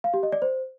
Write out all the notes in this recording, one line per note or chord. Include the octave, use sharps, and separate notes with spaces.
F5
G4
D#5
D5
C5